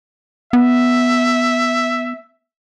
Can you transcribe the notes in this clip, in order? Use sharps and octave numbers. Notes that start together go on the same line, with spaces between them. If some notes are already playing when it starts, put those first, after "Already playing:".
B3 E5